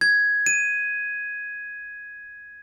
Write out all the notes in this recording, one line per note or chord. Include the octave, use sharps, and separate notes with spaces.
G#6
D#7